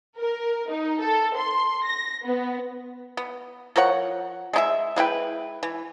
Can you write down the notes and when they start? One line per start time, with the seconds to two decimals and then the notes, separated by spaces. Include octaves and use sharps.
0.18 A#4
0.70 D#4
1.00 A4
1.36 C6
1.85 A#6
2.24 B3
3.17 B3
3.76 F3 A#4 C#5 F#5
4.53 G#3 D#4 E5
4.96 G#3 E4 B4 G5
5.63 E3